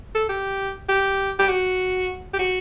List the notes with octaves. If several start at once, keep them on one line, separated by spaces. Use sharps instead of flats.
A4
G4
G4
G4
F#4
G4
F#4